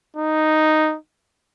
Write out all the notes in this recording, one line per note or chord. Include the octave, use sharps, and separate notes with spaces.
D#4